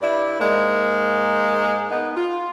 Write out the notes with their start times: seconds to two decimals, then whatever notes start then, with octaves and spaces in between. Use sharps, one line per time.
0.02 G2 E4 D5
0.40 G#2 G#3 A#3
1.90 A#3 B3 D#4
2.16 F4